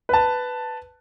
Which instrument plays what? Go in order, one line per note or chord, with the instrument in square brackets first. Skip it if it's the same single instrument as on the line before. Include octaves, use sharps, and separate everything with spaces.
[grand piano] B4 A5